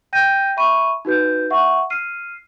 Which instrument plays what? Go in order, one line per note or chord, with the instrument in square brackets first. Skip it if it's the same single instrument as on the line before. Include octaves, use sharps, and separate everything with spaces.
[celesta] G5 G6 A#6 D#7
E5 B5 C#6 D#7
D#4 F#4 B4 G6
E5 F#5 C#6
F6 C7 D#7